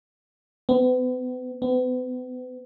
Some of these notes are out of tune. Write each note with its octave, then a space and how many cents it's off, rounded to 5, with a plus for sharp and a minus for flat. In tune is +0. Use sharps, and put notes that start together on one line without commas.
B3 +40
B3 +40